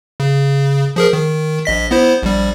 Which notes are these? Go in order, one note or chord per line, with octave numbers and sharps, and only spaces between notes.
C#3
F3 G#4 A#4
D#3
A#1 D#5 B6
B3 E4 C5
A#1 G3